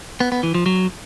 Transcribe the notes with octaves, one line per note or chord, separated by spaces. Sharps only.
B3
B3
E3
F3
F#3